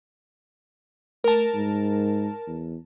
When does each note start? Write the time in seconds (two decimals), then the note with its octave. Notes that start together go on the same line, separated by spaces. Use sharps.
1.24 A3 A#4 A5
1.54 G#2
2.47 E2